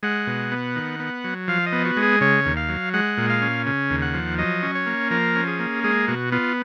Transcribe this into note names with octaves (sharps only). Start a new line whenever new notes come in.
G#3 F#5
B2
B3
D#3
B3
F#3
F3 F5
D#5
B3
F#4
G#3
G#4
C#3 C#5
D#2
F5
F#3
G#3 F#5
A#2
F5
C#4
C#3
D#2
F#5
F3
F#3 D#5
C#4
C#5
A#3
F3 A#4
C#4
G#4
A#3
G#3 G#4
B2 F#4
B3 F4